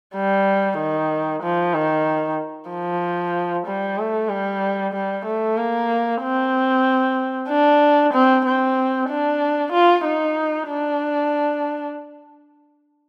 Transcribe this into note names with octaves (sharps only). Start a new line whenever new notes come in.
G3
D#3
F3
D#3
F3
G3
A3
G3
G3
A3
A#3
C4
D4
C4
C4
D4
F4
D#4
D4